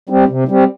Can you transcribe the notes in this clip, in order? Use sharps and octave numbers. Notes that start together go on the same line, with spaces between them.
G3 C4
C3
G3 C4